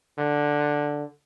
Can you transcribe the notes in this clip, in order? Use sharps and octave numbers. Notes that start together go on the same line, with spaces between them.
D3